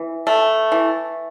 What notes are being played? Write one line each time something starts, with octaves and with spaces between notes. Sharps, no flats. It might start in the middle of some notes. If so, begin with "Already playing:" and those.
Already playing: E3
A3
E3